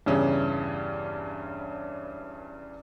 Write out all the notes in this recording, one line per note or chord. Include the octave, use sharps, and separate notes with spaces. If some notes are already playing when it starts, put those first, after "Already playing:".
E2 G2 C#3 C#4